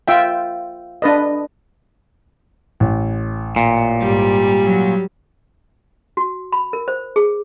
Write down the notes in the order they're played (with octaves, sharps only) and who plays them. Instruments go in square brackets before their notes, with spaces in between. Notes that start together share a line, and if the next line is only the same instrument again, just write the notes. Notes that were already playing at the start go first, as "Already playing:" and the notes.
[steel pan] F4 E5 G5
D4 B4 D#5
[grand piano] A1
[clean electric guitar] A#2
[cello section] G#2 [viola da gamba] G3
[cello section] F#3
[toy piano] F#4
B5
A#4
C5
G#4